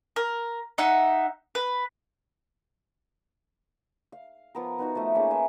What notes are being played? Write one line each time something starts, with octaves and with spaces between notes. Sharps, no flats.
A#4
D#4 E5 F#5
B4
F5
F3 B3 A#4
B3 D#4 F#4
F3 A3 E5
A#3 C#4 D#4 G#4
B4 E5